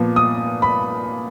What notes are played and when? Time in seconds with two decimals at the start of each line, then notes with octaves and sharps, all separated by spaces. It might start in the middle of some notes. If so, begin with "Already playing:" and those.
Already playing: A#2 F3 B3
0.16 D#6
0.62 B5